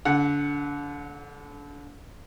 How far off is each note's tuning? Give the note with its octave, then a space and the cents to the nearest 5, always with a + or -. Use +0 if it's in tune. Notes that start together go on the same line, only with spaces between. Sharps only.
D3 -30 F#5 +0